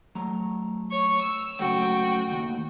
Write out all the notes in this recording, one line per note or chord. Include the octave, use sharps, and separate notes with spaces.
F#3 A3 A#5
C#5 C#6
E6
C#3 F#3 A3 F#4 G5
D#2 A2